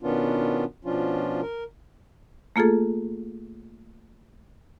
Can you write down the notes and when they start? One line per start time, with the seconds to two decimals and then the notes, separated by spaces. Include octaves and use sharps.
0.03 B2 D#3 B3 C#4 D4 F4
0.85 B2 F3 C#4 D4 F4
1.42 A#4
2.56 A3 A#3 F4 G#4 A4